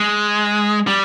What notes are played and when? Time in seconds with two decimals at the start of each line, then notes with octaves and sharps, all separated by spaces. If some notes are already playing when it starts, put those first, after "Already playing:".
Already playing: G#3
0.87 G3